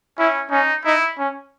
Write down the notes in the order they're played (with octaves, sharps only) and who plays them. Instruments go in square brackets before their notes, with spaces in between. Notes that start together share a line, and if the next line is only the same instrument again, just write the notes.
[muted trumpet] C#4 [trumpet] E4
[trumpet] C#4 [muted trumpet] D#4
[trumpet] D#4 [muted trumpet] E4
[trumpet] C#4